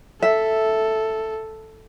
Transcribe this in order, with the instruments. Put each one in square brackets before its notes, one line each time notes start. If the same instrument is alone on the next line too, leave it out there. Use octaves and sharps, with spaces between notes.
[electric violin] A4 [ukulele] E5